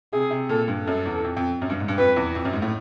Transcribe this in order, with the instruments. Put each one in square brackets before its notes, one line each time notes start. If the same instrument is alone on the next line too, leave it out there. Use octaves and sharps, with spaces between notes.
[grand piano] C3 [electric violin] G#4
[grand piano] C3
[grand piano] A#2 [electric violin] A4
[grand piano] G2
[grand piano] F#2 [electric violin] A4
[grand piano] E2
F2
F2
F#2
G2
G#2
G2
[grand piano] F2 [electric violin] B4
[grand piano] E2
F2
F#2
G#2
A2